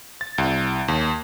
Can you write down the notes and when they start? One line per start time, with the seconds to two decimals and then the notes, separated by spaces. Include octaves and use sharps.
0.21 A6
0.38 C2
0.88 D#2